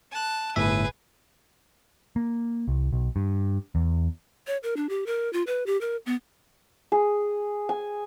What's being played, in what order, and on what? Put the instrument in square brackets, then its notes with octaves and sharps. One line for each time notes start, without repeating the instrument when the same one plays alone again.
[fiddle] A5 F#6
[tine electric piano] G1 A2 E5 [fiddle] G#4 B4
[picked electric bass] A#3
C2
B1
G2
E2
[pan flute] C#5
A#4
D4
G4
A#4
F4
B4
G4
A#4
B3
[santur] G#4
G#5